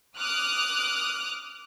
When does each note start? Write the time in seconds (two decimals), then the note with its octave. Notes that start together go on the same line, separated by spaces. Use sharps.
0.18 D6 D#6 F6 F#6